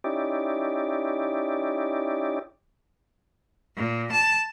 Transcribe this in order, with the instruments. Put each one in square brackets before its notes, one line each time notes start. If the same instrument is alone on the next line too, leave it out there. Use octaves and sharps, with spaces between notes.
[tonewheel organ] C#4 D#4 E4 G4 D5
[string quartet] A#2
A5